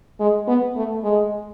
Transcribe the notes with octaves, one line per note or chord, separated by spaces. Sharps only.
G#3
B3
A3
G#3